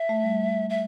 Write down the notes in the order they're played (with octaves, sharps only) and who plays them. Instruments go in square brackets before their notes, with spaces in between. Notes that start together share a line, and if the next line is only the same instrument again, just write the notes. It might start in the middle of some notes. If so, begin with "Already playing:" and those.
Already playing: [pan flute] E5
[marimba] A3
G3
[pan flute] E5